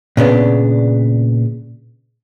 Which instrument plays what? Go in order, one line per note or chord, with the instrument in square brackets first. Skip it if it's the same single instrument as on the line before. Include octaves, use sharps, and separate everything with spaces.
[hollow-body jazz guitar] A#2 C#3 B3 D4